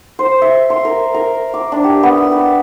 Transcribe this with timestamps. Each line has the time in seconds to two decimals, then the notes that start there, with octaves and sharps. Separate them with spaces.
0.19 C5
0.42 E5
0.70 C6
0.85 A#4
1.14 A#4
1.54 D6
1.72 D4
1.84 G4
2.03 B3
2.18 E6
2.32 B4